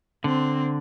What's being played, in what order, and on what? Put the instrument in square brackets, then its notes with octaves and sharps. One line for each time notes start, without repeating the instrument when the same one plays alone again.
[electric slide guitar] D3 [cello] C4